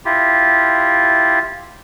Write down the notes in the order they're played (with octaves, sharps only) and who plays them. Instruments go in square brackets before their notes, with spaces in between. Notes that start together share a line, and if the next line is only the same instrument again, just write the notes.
[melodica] E4 F4 G4